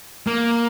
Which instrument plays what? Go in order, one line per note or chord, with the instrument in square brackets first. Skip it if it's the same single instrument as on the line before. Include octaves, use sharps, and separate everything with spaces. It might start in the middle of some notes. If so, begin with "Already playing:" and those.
[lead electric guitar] A#3